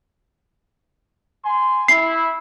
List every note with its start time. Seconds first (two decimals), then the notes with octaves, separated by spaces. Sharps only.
1.44 G#5 C6
1.88 E4 C7